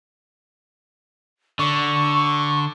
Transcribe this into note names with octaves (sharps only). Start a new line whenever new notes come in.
D3 C#6